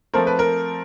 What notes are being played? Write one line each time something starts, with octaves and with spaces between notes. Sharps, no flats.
F3 A3 C4 A#4
B4
A#4